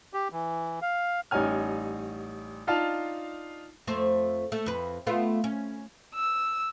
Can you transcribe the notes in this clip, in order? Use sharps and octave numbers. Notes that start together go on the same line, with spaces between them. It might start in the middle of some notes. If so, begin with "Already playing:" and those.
G4
E3
F5
A1 G3 D#4 C#5 G#5 F6
D4 D#4 F4 F5 A5
F2 A3 C5
A3
F2 B4
A3 B3 F4
C#4
E6